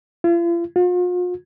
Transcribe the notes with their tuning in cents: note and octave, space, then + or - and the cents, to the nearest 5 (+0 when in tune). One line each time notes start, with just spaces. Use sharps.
F4 -45
F4 +40